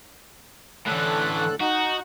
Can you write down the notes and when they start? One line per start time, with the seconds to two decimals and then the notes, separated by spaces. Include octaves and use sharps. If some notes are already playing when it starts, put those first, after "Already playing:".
0.87 A2 D3 E3 A4 F#6
1.60 D#4 F#4